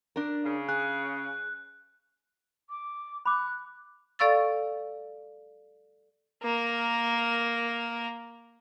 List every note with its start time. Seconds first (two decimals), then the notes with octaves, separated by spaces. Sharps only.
0.16 D4 A#4
0.44 C#3
0.69 G#4 F#6
2.70 D6
3.25 B5 D6 F#6
4.19 A4 D5 F5 C#6 E6 A6
6.42 A#3 A#4